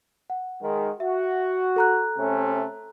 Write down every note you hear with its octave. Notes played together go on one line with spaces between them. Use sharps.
F#5
D#3 G#3
F#4 E5
A4 A#5 F#6
C3 A3 C#4